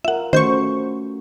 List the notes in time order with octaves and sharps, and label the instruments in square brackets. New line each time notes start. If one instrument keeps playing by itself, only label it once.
[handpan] F4 A#4 [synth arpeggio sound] E5 F#5
[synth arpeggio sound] D#3 G6 [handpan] A3 C#4 F#4 [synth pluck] C5 C#6